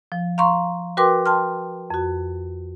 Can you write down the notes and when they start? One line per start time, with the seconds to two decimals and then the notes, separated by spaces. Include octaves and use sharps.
0.12 F3
0.38 F5 A#5 C6 C#6
0.97 F#4 A#4 B4 G5 C6 D6
1.26 G5 A5 C6 F6
1.90 F2 F#4